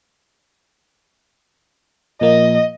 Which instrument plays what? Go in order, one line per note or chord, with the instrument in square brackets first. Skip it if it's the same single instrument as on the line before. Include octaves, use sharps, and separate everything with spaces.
[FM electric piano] A#2 F3 A#3 [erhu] D#5